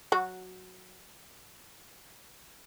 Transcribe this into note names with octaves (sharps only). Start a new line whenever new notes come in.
F#3 F#4